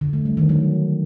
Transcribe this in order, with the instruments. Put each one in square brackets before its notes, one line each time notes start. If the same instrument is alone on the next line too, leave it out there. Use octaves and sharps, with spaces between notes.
[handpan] D3
A3
G3
D#3
F#3